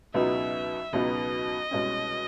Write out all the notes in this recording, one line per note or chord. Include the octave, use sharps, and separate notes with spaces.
C#2 B2 F#3 B3 D#4 E5
C#2 B2 F#3 B3 D#4 D#5
C2 B2 G#3 C#4